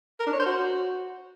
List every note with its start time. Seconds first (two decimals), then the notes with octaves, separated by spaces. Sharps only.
0.19 A#4
0.26 D4
0.33 C#5
0.39 C5
0.46 F#4